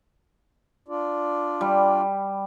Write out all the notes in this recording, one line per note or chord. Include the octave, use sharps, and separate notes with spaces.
D4 F4 D5
G3